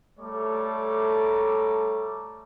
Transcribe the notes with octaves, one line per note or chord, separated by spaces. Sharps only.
G3 A3 A4 C#5 A#5 D6